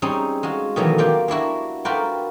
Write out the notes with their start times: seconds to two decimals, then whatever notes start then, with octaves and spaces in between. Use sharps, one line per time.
0.02 G3 C4 C#4 D#4 G#4
0.43 G#3 F4 F#4
0.76 B2 D#3 E3 F#3 A3 A#3
0.98 A#3 F4 G4 D5 G5
1.28 A#3 D4 E4 F#4
1.85 F4 F#4 A#4 B4 D5 G5